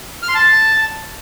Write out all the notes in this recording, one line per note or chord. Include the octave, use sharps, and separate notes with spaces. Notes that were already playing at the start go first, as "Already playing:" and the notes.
F6
C6
A5